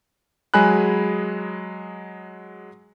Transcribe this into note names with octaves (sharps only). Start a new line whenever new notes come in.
F#3 G#3 G#4 G#5 B5 F#6